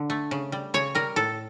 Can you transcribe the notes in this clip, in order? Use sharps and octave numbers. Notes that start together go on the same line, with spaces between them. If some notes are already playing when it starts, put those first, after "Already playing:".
Already playing: D3
A3
C#3
G3
C#3 C#5
G3 A#4
A2 A4